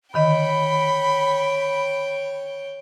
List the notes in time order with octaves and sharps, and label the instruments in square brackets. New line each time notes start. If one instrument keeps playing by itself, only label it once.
[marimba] D3 D#3 D#5 [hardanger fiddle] C#5 G5 [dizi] B5